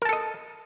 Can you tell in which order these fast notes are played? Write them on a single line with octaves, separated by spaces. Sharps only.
A#4 A5 A4 D#5